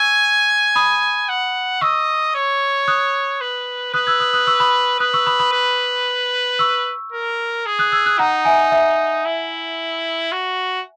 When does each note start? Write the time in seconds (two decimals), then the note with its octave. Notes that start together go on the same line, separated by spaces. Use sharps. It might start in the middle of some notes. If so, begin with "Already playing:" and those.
Already playing: G#5 C#6 E6
0.75 B5 D#6
1.29 F#5
1.81 D#5 C#6 E6
2.35 C#5
2.88 D#6 F#6
3.41 B4
3.94 B4 D#6 F#6
4.07 E6 G#6
4.20 D#6 F#6
4.33 D#6 F#6
4.47 C#6 E6
4.60 B5 D#6
5.00 B4 D#6 F#6
5.14 C#6 E6
5.27 B5 D#6
5.40 B5 D#6
5.53 B4
6.59 C#6 E6
7.12 A#4
7.66 G#4
7.79 D#6 F#6
7.92 E6 G#6
8.06 D#6 F#6
8.19 D#4 F#5 A#5
8.45 E5 G#5
8.72 E5
9.25 E4
10.32 F#4